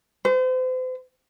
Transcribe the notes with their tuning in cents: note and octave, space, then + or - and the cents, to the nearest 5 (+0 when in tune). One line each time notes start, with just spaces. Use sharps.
C5 -40